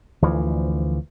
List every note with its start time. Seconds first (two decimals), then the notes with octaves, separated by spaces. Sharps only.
0.22 D2 E3 F3